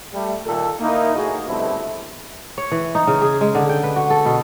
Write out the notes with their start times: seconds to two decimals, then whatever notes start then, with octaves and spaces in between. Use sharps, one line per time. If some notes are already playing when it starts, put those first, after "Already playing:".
0.14 G3 A3
0.46 A#2 D#3 A4
0.80 A#3 D#4 E4
1.16 A2 D#4 F#4 G#4
1.47 G2 B2 D3 A3 C4 E4
2.58 C#5
2.72 E3
2.95 D#4
3.07 C#3
3.22 G#4
3.41 G#3
3.55 D3
3.69 G5
3.84 B4
3.96 F#4
4.10 A4
4.26 B2